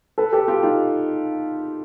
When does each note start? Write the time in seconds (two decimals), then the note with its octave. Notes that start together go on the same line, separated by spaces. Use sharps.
0.18 A4 B4
0.33 G4 A4
0.48 F4 G4
0.63 D#4 F4